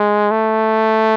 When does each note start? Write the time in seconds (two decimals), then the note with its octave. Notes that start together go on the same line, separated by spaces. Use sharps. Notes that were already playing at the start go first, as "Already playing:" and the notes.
Already playing: G#3
0.31 A3